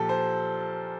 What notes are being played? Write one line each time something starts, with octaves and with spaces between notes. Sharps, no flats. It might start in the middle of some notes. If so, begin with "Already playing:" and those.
Already playing: A#2 F3 G4 A4
C5